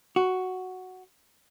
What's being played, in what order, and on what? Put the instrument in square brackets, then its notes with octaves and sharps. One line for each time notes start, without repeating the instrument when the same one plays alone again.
[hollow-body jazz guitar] F#4